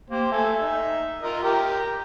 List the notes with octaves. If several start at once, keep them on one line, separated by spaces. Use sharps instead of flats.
A#3 G4 C5
A3 A4 E5 G#5
D#4
F4 A#4 D#5
G4 A#4